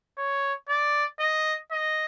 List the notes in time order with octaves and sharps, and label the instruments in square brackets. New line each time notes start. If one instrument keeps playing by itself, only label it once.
[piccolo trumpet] C#5
D5
D#5
D#5